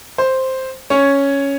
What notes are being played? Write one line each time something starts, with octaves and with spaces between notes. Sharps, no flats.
C5
C#4 C#5